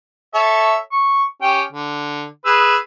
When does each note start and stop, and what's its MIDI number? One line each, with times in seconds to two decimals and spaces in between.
0.34 0.77 69
0.34 0.77 73
0.34 0.77 76
0.92 1.24 85
1.42 1.62 61
1.42 1.62 67
1.42 1.62 79
1.72 2.26 50
2.46 2.76 68
2.46 2.76 71
2.46 2.76 88